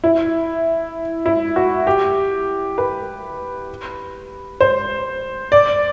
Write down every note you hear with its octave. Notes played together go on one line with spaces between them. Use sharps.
E4
E4
F#4
G4
B4
C5
D5